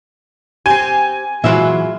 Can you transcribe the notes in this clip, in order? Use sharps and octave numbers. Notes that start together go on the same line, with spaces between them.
C4 G4 G#5
A#2 E3 F#3 G#3 F4 E5